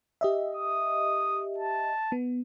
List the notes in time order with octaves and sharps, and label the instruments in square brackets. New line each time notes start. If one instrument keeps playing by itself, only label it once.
[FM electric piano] G4 D#5 E5
[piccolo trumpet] D#6
A5
[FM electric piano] B3